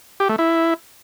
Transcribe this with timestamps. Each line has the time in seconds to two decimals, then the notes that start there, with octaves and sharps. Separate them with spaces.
0.20 G4
0.29 A3
0.38 E4